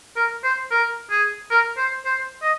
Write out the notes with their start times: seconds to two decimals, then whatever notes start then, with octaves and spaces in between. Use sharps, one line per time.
0.16 A#4
0.44 C5
0.71 A#4
1.10 G#4
1.51 A#4
1.77 C5
2.05 C5
2.42 D#5